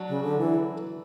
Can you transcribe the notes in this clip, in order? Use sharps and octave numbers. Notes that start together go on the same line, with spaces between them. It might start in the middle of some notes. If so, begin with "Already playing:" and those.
Already playing: F#3 D4
C#3
D3
E3